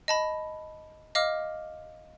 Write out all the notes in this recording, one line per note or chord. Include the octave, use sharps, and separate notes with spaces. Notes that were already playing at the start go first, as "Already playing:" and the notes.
D#5 A5 B5
D#5 F5 D6 F6